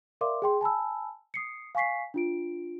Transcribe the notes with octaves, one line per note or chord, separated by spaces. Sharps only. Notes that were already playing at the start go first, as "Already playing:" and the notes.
A#4 D5 E5 F5 C6 D6
G#4 G5 C6
G#5 A5 B5 E6
D#6 C7 C#7
F5 G#5 C#6 B6 C7
D4 F4 D7